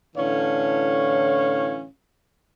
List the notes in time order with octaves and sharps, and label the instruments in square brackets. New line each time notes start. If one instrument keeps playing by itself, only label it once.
[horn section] A2 D3 E3 C#4 C#5 F5